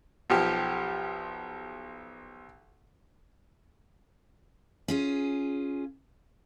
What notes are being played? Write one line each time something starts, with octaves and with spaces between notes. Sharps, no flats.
B1 F3 G4
C#4 F4 G#4